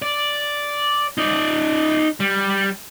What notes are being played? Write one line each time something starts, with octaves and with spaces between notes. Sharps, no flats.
D5
D#4 D5
G3